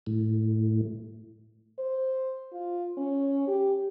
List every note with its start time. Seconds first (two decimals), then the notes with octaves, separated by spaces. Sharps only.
0.07 A2
1.79 C5
2.53 F4
2.97 C#4
3.47 G4